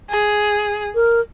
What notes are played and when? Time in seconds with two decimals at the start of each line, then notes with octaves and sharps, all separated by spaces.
0.10 G#4
0.95 A#4